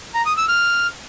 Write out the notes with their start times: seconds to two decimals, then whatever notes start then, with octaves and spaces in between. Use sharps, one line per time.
0.14 A#5
0.26 D#6
0.37 E6
0.48 F6